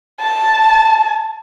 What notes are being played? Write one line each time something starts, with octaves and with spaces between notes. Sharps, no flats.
A5